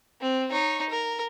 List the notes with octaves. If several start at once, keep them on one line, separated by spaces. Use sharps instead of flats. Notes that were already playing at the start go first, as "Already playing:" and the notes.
C4
D#4 C#5
A#4